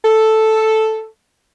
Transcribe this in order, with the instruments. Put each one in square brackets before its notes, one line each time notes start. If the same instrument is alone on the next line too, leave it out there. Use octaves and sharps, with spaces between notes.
[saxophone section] A4